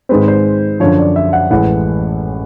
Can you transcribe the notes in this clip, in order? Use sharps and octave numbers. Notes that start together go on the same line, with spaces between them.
G#2 D#3 G#3 C4 B4
C5
F#2 D3 F3 C#5
D5
E5
F#5
A1 A2 E3 G#3 F#5